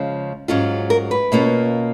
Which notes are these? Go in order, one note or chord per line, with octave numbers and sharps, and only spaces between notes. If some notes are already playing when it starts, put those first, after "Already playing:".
Already playing: C#3 F3 G#3
G#2 F#3 C#4 F4
A#4
B4
B2 A#3 C#4 F4